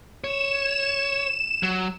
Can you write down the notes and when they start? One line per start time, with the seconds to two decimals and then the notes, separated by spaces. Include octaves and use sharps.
0.24 C#5 E7
1.63 F#3